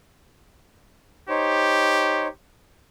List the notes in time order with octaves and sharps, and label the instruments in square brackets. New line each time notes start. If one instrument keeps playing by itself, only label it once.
[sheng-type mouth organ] D#4 C5 C#5 [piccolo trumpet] G4